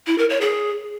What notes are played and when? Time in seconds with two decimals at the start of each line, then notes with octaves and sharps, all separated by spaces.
0.07 E4
0.18 A#4
0.30 C#5
0.41 G#4